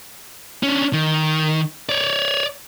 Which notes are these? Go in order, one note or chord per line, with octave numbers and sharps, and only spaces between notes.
C#4 D4
D#3
C#5 D5